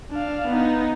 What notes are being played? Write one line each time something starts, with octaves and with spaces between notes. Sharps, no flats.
D4 F5
B3 D#4